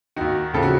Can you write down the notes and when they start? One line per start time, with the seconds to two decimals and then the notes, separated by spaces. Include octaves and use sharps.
0.16 D#2 D#3 F#4
0.53 D#2 C#3 F3 A4
0.62 F#4